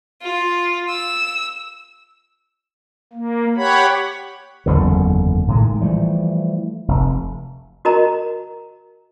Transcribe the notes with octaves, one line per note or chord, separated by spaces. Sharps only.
F4
E6
A#3
G4 C#5 F#5 B5
F#1 E2 D3
A2 D#3 G#3
E3 F3 G3 A3
F1
F#4 A#4 D#5 A#5